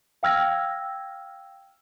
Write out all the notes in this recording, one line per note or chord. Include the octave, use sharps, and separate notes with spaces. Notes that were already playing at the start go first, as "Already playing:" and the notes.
F5 G5 E6 F6 G#6 A#6